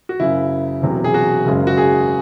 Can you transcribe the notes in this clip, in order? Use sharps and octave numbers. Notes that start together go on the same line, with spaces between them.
F#4
F#1 F#2 C#3 F#3 E4
E1 E2 C3 F#3
G#4
F#4
F#1 F#2 C#3 G#3
F#4
G#4